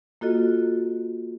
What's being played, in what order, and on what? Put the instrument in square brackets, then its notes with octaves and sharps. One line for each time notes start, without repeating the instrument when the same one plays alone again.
[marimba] A#3 F4 F#4 A4 D#5